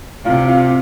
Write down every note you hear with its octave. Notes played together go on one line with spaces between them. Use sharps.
C3 F4 F5
F4 F5